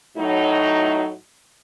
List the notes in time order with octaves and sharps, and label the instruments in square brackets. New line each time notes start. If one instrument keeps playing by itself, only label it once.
[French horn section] A2 F#3 D#4